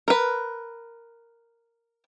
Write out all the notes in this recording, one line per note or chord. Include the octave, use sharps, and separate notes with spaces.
A#4 B4